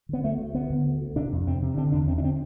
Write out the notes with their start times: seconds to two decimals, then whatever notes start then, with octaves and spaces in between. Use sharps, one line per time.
0.09 D3 B3
0.24 D2 A3
0.39 D2
0.54 D2 B3
0.70 D3
0.85 D2
1.01 D2
1.16 C3 D4
1.32 F2
1.47 C3 C4
1.62 C3
1.77 D3 C4
1.92 E2 D4
2.08 D3 C4
2.18 D4
2.24 C4